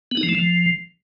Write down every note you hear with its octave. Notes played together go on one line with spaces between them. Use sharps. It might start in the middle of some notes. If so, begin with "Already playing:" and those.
B3
D#4
F3
A3
F3